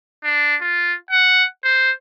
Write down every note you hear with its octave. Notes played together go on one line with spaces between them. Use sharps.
D4
F4
F#5
C5